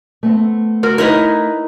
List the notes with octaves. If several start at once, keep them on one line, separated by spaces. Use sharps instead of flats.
A3 B3 C4
F#4 A#4
D#4 E4 A#4 B4 C#5